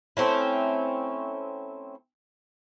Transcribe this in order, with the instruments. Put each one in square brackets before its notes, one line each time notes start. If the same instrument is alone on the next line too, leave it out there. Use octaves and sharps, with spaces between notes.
[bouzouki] A3 C4 C#4 E4